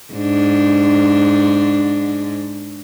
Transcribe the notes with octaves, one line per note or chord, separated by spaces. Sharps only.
G#2 D4